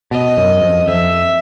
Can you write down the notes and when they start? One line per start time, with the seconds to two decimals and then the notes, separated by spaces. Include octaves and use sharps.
0.11 B2 D#5
0.37 F#2
0.62 F2
0.88 F2 E5